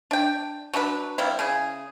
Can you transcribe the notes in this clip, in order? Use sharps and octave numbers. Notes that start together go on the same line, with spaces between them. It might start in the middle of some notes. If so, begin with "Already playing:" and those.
D4 G5
F#3 D4 A#4 B4
C3 G3 A#3 E4
C#3 E4 G#4